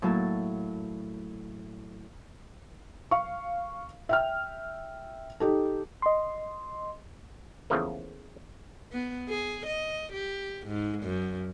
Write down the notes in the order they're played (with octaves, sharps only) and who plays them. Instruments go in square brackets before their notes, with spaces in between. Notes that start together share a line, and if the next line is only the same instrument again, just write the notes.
[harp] A2 F#3 A#3 E4 A5
[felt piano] F5 C#6
E5 G5 F6
D#4 G4 A4
[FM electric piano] D#5 C6
[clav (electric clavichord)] E2 C#3 E3 F3 A3 A#3
[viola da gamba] B3
G#4
D#5
G4
G#2
F#2